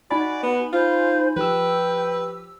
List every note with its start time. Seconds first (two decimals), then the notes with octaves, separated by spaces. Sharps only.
0.11 D#4 F#4 D5 G#5 B5
0.43 B3
0.73 F4 C5
1.36 F3 G4 B4 G5 E6